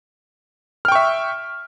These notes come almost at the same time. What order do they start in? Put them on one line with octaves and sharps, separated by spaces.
F6 G5 C#6 E5